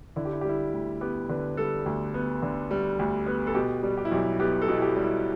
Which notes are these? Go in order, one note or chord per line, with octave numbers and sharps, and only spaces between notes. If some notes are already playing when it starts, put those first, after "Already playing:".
D3 E4
G4
E4
G4
G3 E4
D2
B3 G4
D3 B4
G3 A4
D2
B3
D3
G3
D2
B3
A4
B2 G4
G3
G4
E4
B1 G4
B3 G4
A4
B2
E4
G4
G3
E4